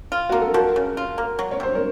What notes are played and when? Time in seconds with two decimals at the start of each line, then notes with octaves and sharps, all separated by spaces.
0.12 F4
0.29 A#3 F#4
0.42 A4
0.54 F3 F#4 A#4
0.76 C#3
0.97 F4
1.18 A#3
1.39 F#3
1.51 C#5
1.60 C3 C5
1.75 A#4 C#5